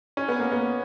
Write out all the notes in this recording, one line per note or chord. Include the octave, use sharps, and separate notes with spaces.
C#4
B3
A#3
B3